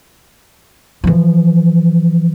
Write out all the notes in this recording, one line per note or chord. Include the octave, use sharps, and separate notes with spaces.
E3 F3